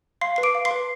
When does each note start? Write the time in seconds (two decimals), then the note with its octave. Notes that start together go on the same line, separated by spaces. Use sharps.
0.21 F5 C6 C7
0.36 B4 C7
0.43 D6 D7
0.55 F5
0.65 C6 C7
0.71 B4